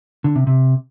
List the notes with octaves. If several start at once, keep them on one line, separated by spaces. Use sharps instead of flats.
D3
C3
C3